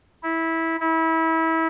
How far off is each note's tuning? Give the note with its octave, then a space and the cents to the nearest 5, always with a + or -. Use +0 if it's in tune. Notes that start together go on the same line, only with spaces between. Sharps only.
E4 -15
E4 -25